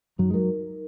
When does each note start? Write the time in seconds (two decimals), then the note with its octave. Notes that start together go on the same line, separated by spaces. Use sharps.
0.18 F#2 F#3 D#4
0.30 G#3
0.34 F#3 A#4